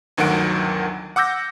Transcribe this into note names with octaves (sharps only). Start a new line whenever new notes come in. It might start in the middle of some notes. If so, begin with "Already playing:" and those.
G1 D2 D#3 F#3 F#5 D7
F#5 D6 E6 G6 A#6